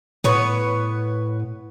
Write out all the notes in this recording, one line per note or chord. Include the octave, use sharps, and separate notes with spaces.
A2 B3 C#5